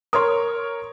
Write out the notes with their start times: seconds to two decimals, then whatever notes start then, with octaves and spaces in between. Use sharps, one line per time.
0.13 A#4 C#5 C6 D#6